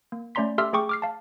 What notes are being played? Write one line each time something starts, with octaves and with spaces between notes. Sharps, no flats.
A#3
A3 C#4 D5 A#5 C6 B6
G4 A4 E5 C6 E6 F6
A3 G#4 G5 C#6 D6
D6 F6 C7
F5 A5